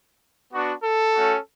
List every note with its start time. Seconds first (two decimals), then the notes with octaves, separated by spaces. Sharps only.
0.52 B3 D4 F#4
0.84 A4
1.14 A3 C#4 F#4